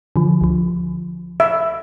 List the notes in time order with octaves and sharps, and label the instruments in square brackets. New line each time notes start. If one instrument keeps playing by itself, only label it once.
[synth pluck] D3 F3
C#2 F3
[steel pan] E5